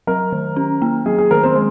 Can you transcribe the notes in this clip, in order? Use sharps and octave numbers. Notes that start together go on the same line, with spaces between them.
F#3 A#4
D#3
C#4
A#3
F#3 G#4
G#4
D#3 A#4
C4
G#3